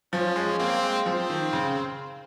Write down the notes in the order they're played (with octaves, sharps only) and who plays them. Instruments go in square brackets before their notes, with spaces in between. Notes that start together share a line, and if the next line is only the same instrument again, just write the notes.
[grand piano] F3 [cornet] C#4
[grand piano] G#3
[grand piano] A#3 [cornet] C4
[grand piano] G#3
[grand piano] F3 [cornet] C4
[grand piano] D#3
C#3